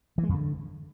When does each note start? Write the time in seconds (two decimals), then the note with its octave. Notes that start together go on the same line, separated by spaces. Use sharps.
0.18 E3
0.23 G#3
0.29 F2
0.34 D3